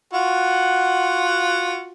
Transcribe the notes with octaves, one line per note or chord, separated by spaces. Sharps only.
F4 F#4 F#5